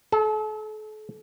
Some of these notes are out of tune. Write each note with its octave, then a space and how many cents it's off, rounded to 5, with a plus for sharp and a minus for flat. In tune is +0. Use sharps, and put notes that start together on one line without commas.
A4 -40 A5 +10